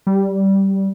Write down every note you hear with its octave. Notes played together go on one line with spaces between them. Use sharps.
G3